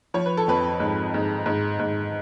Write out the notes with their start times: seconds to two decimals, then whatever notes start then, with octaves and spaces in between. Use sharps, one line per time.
0.14 F3 C#5
0.25 B4
0.37 A4
0.48 F2 B4
0.80 G#2
1.14 G#2
1.46 G#2
1.79 G#2